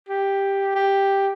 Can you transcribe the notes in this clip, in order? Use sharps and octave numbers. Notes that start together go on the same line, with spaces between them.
G4
G4